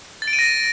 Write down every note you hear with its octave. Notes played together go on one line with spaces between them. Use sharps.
A6
D7
D#7
A#6